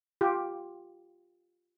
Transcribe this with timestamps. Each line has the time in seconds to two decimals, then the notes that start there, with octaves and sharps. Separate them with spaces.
0.21 F4 G4